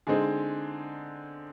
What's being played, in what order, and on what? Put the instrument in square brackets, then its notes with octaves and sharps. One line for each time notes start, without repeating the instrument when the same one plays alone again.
[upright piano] D3 G#3 C4 D#4 G#4